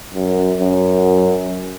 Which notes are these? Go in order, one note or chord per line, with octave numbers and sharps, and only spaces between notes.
F#2
F#2